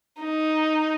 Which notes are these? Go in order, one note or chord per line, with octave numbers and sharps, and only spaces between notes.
D#4